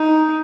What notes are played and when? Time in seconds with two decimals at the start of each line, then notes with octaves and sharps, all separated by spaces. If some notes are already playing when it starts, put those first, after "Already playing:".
Already playing: D#4